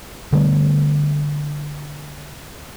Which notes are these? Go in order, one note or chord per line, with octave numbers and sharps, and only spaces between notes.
D3 G3 A3 B3